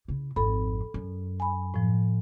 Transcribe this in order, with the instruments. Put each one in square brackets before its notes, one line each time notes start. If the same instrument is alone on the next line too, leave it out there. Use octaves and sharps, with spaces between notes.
[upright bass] C#3 E4
[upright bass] G#1 F2 [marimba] A4 B5
[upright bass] F#2
[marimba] G#5 B5
A2 F3